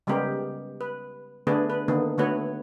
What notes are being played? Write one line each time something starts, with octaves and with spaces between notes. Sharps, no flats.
C#3 G3 G#3 B3 G4 A#4
B4
D3 A3 B3 D4 G#4 B4
B4
D3 D#3 A#3 B3 D#4
D3 A3 B3 F#4 B4 C#5